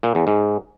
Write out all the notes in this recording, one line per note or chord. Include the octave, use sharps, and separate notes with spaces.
A#2
E2
G#2